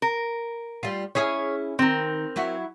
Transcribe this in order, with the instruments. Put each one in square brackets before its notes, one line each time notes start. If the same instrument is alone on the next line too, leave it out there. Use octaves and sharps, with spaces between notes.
[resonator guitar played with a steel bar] A#4
[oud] G3 F4
[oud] C#4 E4 G#4 [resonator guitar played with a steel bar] C#5
[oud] D#3 [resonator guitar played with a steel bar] C4 A#4
[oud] F#3 E4 F#4